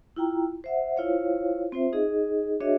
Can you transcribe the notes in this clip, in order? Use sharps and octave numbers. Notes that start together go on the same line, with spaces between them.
E4 F4 G5 A#5
C5 E5 F#5
E4 F4 C5 C#5 F5
C4 F4 C5 E5
D#4 G#4 D#5
D4 F#4 G#4 C#5 D#5 E5